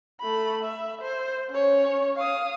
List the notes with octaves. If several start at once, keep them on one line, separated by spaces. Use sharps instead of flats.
A3 B5
E5
C5
C#4 C#5
F5 D#6